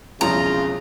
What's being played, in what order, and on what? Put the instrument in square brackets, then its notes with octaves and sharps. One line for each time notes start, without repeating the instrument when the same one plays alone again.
[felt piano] E1 C2 F2 [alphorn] C#3 [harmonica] F4 [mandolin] A#5